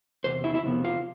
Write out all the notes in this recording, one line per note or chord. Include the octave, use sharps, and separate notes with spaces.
E2 C3 C5
E4 E5
E4 E5
F2 C3 F3 B3
F4 F5